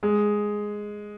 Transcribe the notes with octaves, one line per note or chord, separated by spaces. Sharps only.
G#3 G#4